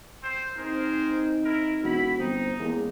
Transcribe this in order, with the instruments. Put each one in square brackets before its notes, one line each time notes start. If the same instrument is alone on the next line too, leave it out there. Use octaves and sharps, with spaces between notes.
[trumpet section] C4 C5
[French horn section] C4 D#4 [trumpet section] G#4 A#4 C5
[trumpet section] E4 A#4
[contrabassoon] E1 [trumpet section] E4 B5 [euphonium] F#4
[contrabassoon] G1 [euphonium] C4 [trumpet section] D#4
[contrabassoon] E2 [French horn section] G#3 C#4 G4 [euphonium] A#3